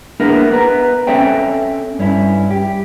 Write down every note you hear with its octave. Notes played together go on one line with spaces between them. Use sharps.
A#3 B3 D4 E4 G#4 A#4
B3 B4 A#5
C4 C#4 A4 C#5 E5 G5
G2 C#4 E4
G4